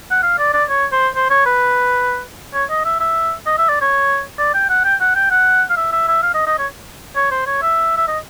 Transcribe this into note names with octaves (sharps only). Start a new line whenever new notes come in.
F#5
F5
D5
D5
C#5
C5
C5
C#5
B4
C#5
D#5
E5
E5
D#5
E5
D5
C#5
D5
G5
F#5
G5
F#5
G5
F#5
F5
E5
E5
E5
F5
D#5
D#5
C#5
C#5
C5
C#5
E5
E5
D#5